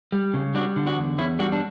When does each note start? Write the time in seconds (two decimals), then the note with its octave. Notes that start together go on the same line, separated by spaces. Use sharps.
0.12 G3
0.34 C#3
0.54 G3 D4 F#4
0.76 D3
0.86 D4 F#4
0.97 E2
1.18 E2 C#4 E4
1.39 G3 D4 F#4
1.52 D4